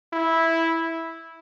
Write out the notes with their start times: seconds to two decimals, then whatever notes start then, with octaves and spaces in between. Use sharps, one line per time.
0.13 E4